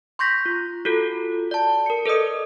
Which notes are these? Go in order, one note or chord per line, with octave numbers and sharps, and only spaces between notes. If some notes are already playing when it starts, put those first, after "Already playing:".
C6 C#6 G6 A#6 B6
F4
F4 F#4 A4
D5 A5
A#4 C#7
A4 B4 D5 D#5 D#6